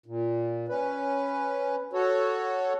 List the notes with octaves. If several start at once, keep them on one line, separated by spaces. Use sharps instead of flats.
A#2
C#4 B4
F#4 A4 C#5